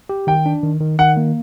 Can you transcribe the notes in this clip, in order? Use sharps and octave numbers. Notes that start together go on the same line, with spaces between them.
G4
D#3 G5
D4
D#3
D#3
D#3 F#5
A#3